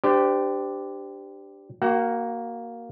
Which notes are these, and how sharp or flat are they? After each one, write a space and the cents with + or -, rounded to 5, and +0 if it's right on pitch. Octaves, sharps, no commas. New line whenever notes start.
D4 +0 G4 +0 C5 -35
A#3 +0 F#4 +15 F#5 +40